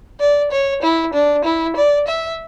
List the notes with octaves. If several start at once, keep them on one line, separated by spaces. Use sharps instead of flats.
D5
C#5
E4
D4
E4
D5
E5